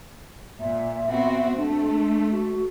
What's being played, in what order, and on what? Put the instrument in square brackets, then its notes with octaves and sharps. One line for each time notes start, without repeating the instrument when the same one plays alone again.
[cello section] A#2 [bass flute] E5
[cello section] B3 C4 F#4
[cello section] A3 [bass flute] D4
[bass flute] F#4